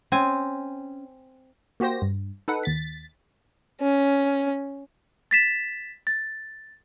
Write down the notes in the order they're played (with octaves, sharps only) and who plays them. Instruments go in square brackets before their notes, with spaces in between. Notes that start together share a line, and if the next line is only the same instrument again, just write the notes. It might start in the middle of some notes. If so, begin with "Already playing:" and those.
[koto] C4 G#5 [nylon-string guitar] C#4
[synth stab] A#3 F#4 G4 C5 A#6
G2
D#4 A4 B4 F#5
D#2 A6 B6
[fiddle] C#4
[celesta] A6 B6 E7
A6